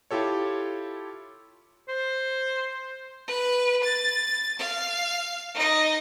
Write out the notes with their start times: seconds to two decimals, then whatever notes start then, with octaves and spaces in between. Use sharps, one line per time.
0.11 E4 F4 G4 A4 C#5
1.89 C5
3.27 B4
3.84 A6
4.59 F5
5.54 D#4 D#5